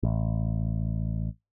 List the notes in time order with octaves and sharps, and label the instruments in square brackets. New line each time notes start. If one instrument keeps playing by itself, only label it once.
[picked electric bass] A1